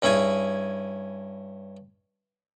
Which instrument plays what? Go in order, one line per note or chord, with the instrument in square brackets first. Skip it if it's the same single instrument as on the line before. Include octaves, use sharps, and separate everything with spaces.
[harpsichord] G2 C#4 E4 G#4 G#5